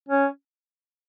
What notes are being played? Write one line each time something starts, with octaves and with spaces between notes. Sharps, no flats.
C#4